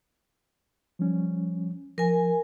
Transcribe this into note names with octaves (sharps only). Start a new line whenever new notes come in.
F3 G3 C#4
F3 A#4 G#5